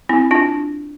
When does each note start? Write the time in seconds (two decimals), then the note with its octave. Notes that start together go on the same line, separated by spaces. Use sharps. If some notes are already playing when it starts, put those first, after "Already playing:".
0.09 C4 E4
0.31 D4 F4